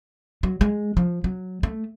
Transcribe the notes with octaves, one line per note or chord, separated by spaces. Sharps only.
F#3
G#3
F3
F#3
A3